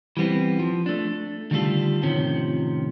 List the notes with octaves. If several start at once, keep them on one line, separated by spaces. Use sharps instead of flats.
E3 G3 B3 C4
F3
A3 D4
D3 D#3 G3 A3 F4 A4
A2 C3 D#3 F3 C#4